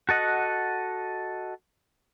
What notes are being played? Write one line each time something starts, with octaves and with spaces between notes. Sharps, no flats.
F#4 A4 D#5 F#5